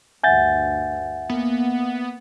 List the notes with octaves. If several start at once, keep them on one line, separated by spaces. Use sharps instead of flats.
D2 G2 E5 F#5 G#5 G6 A6
A#3 B3